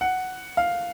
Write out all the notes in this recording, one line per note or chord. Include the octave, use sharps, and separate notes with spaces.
F#5
F5